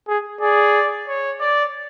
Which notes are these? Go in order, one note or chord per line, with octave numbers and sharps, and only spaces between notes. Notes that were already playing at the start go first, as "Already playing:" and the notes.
G#4
G#4 D5
C#5
D5